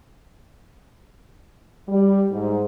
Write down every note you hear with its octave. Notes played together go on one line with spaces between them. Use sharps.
G3
G#2